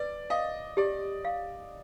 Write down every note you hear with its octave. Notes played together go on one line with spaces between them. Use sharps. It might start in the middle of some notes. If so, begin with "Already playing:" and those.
Already playing: B4 D5
D#5 F5
G4 D5
F5